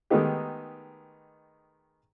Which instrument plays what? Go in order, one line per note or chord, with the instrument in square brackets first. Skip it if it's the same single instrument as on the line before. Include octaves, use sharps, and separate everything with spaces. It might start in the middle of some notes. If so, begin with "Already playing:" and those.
[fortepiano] D#3 G#3 A3 B3 D#4 G4